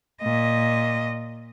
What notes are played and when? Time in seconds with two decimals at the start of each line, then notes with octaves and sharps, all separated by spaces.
0.22 A#2 D#5